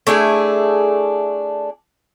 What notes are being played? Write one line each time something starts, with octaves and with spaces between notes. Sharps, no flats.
A3 D4 E4 G#4